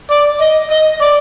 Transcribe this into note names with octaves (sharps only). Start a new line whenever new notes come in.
D5
D#5
D#5
D5